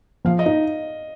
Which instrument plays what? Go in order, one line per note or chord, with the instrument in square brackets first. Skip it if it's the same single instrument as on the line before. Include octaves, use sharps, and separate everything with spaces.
[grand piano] F3 [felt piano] F5
[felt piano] D#5
[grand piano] D#4